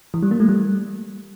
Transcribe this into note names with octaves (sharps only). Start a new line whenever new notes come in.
E3
G3
A#3
A3
G3